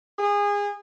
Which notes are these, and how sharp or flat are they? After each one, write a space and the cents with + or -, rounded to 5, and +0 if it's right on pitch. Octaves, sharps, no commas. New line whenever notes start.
G#4 -25